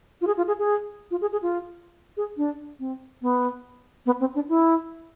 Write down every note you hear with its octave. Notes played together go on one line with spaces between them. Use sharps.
F4
G#4
F4
G#4
G#4
F4
G#4
G#4
F4
G#4
D4
C4
B3
B3
C4
D4
E4